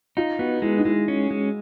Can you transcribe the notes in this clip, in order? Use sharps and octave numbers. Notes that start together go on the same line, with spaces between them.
D#4 F4
B3 F#4
G#3 E4
D#4
G#3 E4
C#4
G#3